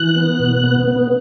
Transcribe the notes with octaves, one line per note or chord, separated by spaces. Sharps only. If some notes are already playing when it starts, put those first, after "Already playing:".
Already playing: E3 F#6
B3
B2
B3
B3